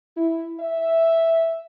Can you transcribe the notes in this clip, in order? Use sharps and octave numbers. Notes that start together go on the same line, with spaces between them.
E4
E5